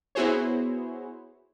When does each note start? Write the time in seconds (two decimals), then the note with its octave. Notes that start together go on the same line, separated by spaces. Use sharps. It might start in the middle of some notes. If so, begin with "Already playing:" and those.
0.15 B3 E4 F#4 G#4 C5 C#5